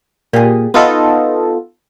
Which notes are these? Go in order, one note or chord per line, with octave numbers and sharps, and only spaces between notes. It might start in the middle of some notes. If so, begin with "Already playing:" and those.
A#2 G4 G#4
B3 D#4 F4 F#4 A4 B4